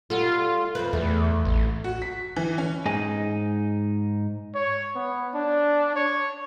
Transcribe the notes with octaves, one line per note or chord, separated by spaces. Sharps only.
G3 F4 F#4 A4
F2 C4 B4
E2 A3
A1
F#4
B6
E3
C#4
G#2 D#4 D#5 G#5
C#5
B3
D4
C#5